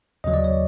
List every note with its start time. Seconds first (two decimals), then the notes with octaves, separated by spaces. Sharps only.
0.24 D#2 C#3 F#3 D#5
0.34 D5
0.44 C#5